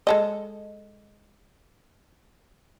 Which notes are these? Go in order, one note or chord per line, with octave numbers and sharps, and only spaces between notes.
G#3 A4 D#5